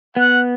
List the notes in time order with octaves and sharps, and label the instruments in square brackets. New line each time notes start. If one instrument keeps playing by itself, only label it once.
[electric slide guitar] B3 [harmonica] F#5